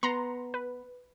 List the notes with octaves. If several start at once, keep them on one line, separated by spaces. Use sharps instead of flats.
B3 A#5 C6
B4